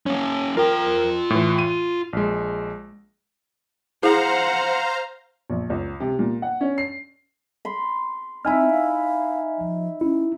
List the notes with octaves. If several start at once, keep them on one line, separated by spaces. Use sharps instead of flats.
A#3 C#4 C#5
F4 A#4 G5
A2 E3
D#7
A#1 G#3
E4 G#4 C5 F5 F#5 A#5
A#1
C#2
C3
A#2
F#5
C#4
C7
B5 C6
C4 D#4 E4 E5 G#5 F6
F5
F3
C#4 E4